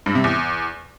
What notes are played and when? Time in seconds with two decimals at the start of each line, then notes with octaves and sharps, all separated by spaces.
0.06 G2
0.15 C3
0.24 E2